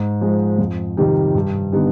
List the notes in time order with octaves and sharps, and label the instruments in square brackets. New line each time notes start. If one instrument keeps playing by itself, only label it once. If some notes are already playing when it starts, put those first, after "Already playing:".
Already playing: [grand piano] G#2
F3 G#3
F2
C3 D#3 G3
G2
D3 G3 B3 D#4